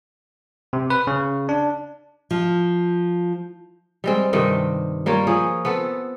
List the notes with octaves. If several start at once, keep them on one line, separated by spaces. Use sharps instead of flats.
C3
B4
C#3
D4
F3
G3 G#3 C4
G2 C3 D#3 C4
G3 A#3 F4 C#5
F3 G#4 C#5
B3 C4 A4